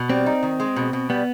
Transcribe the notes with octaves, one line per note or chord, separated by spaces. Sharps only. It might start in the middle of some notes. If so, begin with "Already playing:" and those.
Already playing: B2
G3 C4
D#4
D#3
G#3
B2
B2
G3 B3